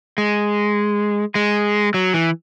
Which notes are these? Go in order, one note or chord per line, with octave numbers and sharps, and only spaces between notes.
G#3
G#3
F#3
E3